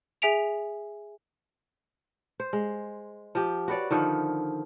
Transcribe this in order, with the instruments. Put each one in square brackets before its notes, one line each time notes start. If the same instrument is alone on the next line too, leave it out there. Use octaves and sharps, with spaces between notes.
[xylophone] G#4 E5 G#5 B6 D7 F7
[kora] C5
G#3
F3 G4
F#4 B4 C#5 D5
D3 D#3 F3